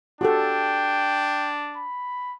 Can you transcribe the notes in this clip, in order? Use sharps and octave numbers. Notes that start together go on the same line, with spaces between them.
D4 F#4 G4 A4 G5
B5